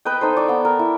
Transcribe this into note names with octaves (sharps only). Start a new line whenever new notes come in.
B4 D#5 G5
D#4 A4 C5
D5 C#6
B3 G5
A#4
E4